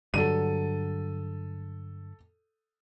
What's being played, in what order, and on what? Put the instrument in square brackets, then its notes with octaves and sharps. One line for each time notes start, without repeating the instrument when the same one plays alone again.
[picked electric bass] G2 D3 F#3 [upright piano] A4 D#7